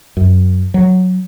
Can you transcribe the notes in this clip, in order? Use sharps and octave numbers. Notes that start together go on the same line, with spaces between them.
F#2
F#3